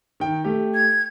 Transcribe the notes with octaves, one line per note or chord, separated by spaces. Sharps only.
D#3 G5
A3 G4
G#6